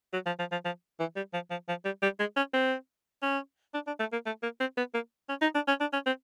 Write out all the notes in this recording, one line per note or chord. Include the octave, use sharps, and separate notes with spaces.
F#3
F3
F3
F3
F3
E3
G3
F3
F3
F3
G3
G3
G#3
C#4
C4
C#4
D4
D4
A3
A#3
A3
A#3
C4
B3
A#3
C#4
D#4
D4
C#4
D4
C#4
C4